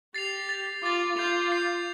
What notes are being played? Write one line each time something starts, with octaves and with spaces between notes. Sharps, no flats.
G4 A6 C7 F7
A6 F7
F4 D6 A6 F7
F4 G6 C7 F7
D6 G6 C7 F7